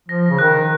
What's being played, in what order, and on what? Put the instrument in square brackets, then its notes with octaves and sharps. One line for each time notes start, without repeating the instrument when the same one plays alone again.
[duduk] F3 [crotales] A#6
[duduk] C#3
[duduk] D#3 [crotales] F#6